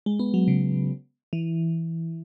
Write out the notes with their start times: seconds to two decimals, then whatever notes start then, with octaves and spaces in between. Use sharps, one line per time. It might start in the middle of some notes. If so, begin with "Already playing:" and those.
0.06 G#3
0.19 B3
0.34 F#3
0.48 C#3
1.33 E3